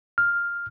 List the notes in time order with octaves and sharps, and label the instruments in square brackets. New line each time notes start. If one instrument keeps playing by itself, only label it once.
[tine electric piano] F6